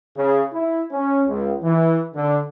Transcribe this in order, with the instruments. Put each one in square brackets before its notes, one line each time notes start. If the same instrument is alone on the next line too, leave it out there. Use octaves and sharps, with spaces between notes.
[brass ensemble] C#3
E4
C#4
C#2
E3
D3